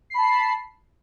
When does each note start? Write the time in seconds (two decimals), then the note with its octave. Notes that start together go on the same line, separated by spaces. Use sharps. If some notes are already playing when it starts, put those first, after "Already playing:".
0.10 C7
0.14 B5
0.18 A5